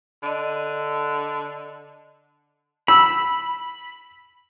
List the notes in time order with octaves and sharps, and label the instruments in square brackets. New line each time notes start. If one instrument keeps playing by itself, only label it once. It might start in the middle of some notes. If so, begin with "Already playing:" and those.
[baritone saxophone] D3 [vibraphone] D5 D#5
[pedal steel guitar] B5 [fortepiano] E6